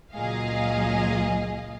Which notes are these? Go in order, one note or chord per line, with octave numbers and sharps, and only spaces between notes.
C#2 A#2 F#3 G#4 D#5 F5